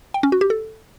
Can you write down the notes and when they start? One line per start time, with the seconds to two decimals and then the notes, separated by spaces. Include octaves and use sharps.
0.14 G5
0.23 C#4
0.32 F#4
0.41 G4
0.50 A4